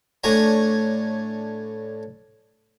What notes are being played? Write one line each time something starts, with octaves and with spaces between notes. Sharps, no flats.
A2 D4 C#5 G#5 A#5